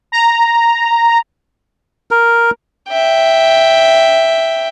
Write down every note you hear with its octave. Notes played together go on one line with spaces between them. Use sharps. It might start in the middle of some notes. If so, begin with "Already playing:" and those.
A#5
A#4
E5 G5